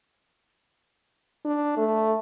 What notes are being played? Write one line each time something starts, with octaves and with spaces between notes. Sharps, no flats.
D4
A3